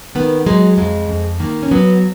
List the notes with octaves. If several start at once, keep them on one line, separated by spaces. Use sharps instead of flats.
D#3 B3
F#3 G#3
F2 G#3
F2
D#3 A#3
C#4
F#3 B3